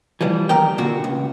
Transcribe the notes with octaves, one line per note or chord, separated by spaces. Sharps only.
E3 F3 G3
F2 D#3 G4 A#4 G5
A#2 D3 F#4
C#2